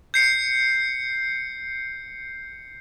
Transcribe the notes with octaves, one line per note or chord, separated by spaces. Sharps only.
G6 C7 C#7